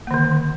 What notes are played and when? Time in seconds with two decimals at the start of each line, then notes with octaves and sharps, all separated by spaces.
0.07 A#3
0.11 D#3
0.14 D3